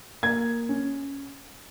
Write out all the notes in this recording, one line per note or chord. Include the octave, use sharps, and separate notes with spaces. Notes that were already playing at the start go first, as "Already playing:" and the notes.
A#3 G#6
C#4